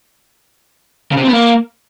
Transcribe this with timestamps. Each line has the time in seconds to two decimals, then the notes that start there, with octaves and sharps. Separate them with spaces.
1.12 C#3
1.17 C3
1.22 C4
1.27 B3
1.33 A#3